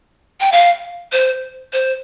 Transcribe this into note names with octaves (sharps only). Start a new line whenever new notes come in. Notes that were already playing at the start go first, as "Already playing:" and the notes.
G5
F5
C5
C5